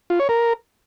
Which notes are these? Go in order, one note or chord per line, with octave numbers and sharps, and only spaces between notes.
F4
C#5
A#4